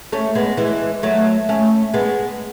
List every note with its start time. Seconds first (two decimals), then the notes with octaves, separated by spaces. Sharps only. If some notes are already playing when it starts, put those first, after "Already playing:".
0.12 A3 C#4
0.35 G#3 B3
0.57 E3 G#3
1.03 F#3 A3
1.49 A3 C#4
1.94 G#3 B3